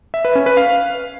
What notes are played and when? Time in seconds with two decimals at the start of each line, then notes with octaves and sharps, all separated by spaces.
0.14 E5
0.25 B4
0.35 C#4
0.46 B4
0.57 F5